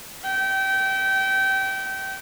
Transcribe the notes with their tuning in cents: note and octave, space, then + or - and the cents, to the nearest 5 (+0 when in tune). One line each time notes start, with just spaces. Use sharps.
E5 -40 G5 -25